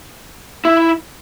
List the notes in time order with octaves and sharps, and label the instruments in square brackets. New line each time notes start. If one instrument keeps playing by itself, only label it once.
[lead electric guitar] E4